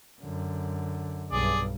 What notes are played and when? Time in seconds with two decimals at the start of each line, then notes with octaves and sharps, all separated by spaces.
0.22 F#2 D3
1.31 B1 G2 G#4 D5